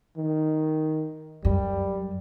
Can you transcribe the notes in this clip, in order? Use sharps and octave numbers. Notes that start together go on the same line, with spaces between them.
D#3
F#2 G3